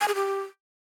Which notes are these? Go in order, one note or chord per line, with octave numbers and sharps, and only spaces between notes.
G#5
G#4
G4